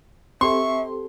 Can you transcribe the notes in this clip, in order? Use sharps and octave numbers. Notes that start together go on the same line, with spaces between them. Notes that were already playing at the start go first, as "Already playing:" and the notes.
C4 G4 A4 E5 C6 C#6